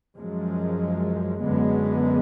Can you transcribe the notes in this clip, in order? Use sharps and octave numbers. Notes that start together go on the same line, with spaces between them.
F#2 F3 G#3
F#2 D3 G#3 B3